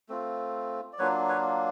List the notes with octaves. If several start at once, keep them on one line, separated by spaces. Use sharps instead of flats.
A3 C4 F4
D5
F#3 A#3 D4 F4 B4 C#5
B4 C#5